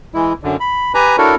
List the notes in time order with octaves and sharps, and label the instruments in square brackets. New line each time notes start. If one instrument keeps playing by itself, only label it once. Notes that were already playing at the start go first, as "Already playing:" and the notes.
[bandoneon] E3 G#3 E4
F#2 D3
B5
G4 B4 G#5 A#5
D4 E4 F#4 A4 A#4 C#5